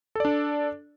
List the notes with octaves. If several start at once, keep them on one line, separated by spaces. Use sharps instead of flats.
D4 A4 D5